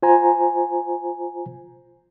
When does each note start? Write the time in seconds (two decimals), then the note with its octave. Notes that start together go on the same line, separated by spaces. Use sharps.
0.03 F4 C5 G#5 A#5